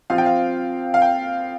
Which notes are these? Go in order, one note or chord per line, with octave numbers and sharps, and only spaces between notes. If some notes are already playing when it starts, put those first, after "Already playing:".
F3 C4 F4 F5
G5
F5
F5
G5